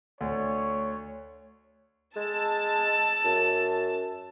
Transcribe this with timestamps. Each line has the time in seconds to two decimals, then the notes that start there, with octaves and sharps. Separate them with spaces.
0.21 D2 C#5
2.16 G#3 A5 E6
3.24 F#2